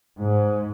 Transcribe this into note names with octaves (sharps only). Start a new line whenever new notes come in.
G#2